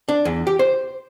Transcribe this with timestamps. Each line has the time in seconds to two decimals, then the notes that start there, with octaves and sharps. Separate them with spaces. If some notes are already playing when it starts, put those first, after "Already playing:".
0.09 D4
0.25 E2
0.47 G4
0.59 C5